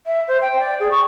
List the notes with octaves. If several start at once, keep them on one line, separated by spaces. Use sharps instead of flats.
E5
C5
G5
D5
G#4
C#6